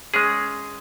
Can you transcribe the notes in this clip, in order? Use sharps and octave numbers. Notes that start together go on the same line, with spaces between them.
G#3 C#4 G#4